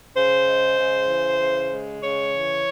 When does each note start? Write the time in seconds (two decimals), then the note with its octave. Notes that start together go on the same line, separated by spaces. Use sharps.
0.16 C#3 C5
0.47 G#3
0.78 C#3
1.08 E3
1.39 C#3
1.71 G#3
2.01 C#3 C#5
2.33 E3